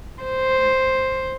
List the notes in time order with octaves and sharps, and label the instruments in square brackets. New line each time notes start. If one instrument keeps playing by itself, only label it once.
[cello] C5